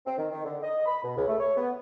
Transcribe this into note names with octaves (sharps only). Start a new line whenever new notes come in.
C4
D#3
D#3
D3
D#5
B5
B2
C#2
A3
C#5
B3